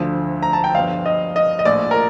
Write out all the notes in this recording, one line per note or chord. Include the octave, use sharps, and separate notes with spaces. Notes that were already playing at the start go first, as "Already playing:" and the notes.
Already playing: D2 D3 F3
A#5
A5
G5
G1 G2 F3 F5
D#5
D#5
D#5
A#1 A2 F3 D5
A#4